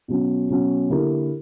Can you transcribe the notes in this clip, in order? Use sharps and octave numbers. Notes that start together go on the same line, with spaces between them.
B2 F#3 C#4
B2 F#3 C#4
D3 A#3 E4 G4 A#4